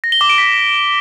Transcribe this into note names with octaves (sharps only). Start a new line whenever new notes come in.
A#6
G7
D6
D7
B6